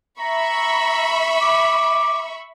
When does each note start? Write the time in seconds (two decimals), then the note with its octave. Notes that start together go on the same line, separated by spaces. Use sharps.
0.20 E5 A#5 B5 C#6
1.41 D6